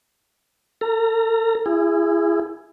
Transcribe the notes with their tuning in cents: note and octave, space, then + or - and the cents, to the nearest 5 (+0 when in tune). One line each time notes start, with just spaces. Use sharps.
A4 +45 A#5 +0
E4 +30 G#4 -15